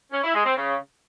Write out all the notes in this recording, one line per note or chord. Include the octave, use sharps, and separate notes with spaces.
C#4
E4
G#3
C4
C#3